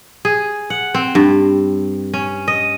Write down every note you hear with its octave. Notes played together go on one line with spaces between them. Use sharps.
G#4
F#5
C4
G2
C#4
D#5